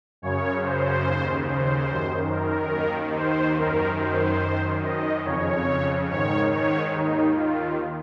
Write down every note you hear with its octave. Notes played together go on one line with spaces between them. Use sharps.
F#2 C#3 C#5
C5
D#2 C#3
C5
F#2 D#3
A#4
D#2 D#3
C5
F#2 D#3 A#4
C5
F#2 D#3
D#5
F2 C#3 C#5
G#2 D#3 C#5
C#5
D#2 D#3 D#4
F4